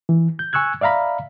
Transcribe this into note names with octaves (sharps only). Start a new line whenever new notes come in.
E3
G6
G#5 C#6 E6 F#6 G#6
D5 E5 F5 A#5 B5